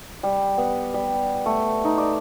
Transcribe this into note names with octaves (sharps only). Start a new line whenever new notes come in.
G3
B3
G3
A3
D#4
D5